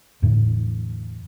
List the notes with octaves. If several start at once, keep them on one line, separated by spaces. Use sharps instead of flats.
E2 A2 D3